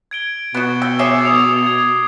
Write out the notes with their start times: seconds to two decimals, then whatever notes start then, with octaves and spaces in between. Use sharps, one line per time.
0.11 G#6 D7 G7
0.55 B2 B3 F#4
0.82 G5 E6
0.99 G#4 C#5 E5 D6 C7 G7
1.24 D6 D#6 F7
1.66 D#6 G#6